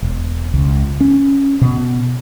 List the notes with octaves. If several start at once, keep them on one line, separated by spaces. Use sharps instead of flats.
E1
C#2
C#4
B2